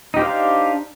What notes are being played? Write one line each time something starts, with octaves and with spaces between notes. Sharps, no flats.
D4 D#4 G4 C5 F5